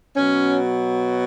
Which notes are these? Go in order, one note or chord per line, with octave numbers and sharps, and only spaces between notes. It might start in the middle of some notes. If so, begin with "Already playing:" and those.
B2 F#3 C#4